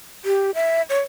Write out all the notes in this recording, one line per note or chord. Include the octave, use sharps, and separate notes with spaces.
G4
E5
C#5